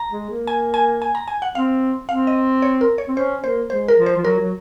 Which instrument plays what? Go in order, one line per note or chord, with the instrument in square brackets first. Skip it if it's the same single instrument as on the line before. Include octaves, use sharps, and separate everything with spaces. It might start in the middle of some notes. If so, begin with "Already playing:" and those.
Already playing: [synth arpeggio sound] A#5
[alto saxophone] G#3
A#3
[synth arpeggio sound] G#5
G#5
G#5
A#5
G#5
F#5
[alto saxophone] C4 [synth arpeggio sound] F5
[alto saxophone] C4 [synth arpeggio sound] F5
[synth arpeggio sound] D#5
C#5
A#4
C#5
[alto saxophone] C4
[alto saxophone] C#4 [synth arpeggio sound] C5
[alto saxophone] A#3 [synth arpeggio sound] C5
[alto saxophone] G#3 [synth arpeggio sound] C5
[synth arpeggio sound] A#4
[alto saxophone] F3
[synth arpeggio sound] C5
[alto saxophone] F3
[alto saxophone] F#3 [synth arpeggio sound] A#4
[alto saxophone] F#3